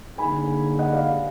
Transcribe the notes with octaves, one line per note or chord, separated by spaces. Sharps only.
D3 F#3 A#3 D#4 G#4 G#5 B5
D#5 F#5
D5 F5